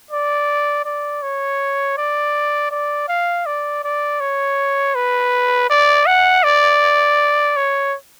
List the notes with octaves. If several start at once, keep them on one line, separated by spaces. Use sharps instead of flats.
D5
D5
C#5
D5
D5
F5
D5
D5
C#5
B4
D5
F#5
D5
C#5